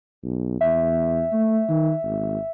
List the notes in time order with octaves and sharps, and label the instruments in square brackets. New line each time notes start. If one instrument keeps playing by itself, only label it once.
[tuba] B1
[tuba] E2 [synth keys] E5
[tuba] A3
D#3
G#1